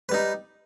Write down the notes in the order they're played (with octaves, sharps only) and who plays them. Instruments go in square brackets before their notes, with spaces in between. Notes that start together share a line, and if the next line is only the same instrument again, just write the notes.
[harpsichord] B4
G3
D#4